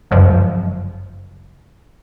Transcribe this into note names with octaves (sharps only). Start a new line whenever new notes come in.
G1 C#2 F#2 F3